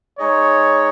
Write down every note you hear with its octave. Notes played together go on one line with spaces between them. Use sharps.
G#3 D#4 G#4 C#5 D#5